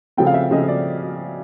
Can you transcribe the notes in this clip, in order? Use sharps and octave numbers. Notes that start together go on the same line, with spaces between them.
C#3 F3 A3 C4 G5
F5
E5
C#3 F3 A3 C4 D#5
D5